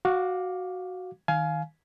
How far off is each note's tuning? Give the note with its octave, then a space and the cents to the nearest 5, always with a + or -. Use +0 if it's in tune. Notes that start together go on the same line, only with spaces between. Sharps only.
F#4 +0 F5 +20 D6 +0
D#3 +15 F5 +0 G#5 +25